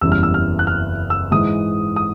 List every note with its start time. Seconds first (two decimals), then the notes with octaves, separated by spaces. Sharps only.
0.01 F#1 E2 C#3 E3 G3 E6
0.12 F6
0.23 E6
0.34 F6
0.59 F#6
0.67 F6
1.10 E6
1.31 G#2 E3 G#3 D#6
1.96 D#6